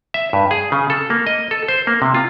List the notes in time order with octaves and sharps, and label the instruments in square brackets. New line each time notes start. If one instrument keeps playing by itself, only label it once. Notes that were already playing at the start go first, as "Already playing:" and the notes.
[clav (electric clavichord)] E5
G2
G#4
C#3
A4
A#3
D#5
A4
C5
A#3
C3
F4